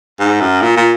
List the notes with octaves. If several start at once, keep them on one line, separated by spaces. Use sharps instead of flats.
G#2
F#2
A#2
A#2